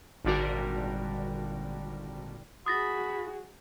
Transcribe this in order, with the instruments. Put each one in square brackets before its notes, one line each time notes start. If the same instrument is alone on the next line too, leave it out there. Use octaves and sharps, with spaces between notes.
[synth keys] G#1 A#2 D3 G3 F#4 A#4
[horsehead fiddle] F#4 G#4 [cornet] B5 [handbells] D#6 A6 A#6